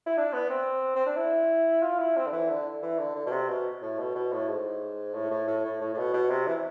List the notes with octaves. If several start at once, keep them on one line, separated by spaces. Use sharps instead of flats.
E4
D4
B3
C4
C4
D4
E4
F4
E4
C4
D3
E3
D3
E3
D3
D3
B2
C3
B2
A2
B2
B2
A2
G#2
A2
A2
A2
A2
A2
A2
B2
B2
C3
E3